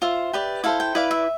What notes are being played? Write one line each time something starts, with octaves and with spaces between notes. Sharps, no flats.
F4 C5 E5
G4 B4 D5
E4 A4 C5 F5
G5
E4 B4 D5 F5
E5